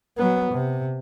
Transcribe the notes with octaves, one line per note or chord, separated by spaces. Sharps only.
F#3 B3
C3